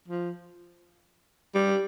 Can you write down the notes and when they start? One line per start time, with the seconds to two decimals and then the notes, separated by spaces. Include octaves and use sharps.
0.08 F3
1.55 G3